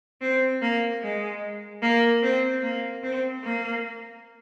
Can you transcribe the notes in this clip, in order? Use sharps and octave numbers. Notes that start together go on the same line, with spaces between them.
C4
A#3
G#3
A#3
C4
A#3
C4
A#3